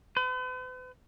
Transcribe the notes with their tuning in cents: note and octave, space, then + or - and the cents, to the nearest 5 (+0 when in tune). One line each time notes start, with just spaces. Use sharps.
B4 +45